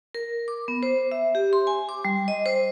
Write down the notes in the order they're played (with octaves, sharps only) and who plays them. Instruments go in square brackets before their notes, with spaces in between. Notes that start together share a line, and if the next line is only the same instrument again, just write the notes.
[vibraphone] A#4
D6
B3
C5
E5
G4
C6
G#5
D6
G3
D#5
C5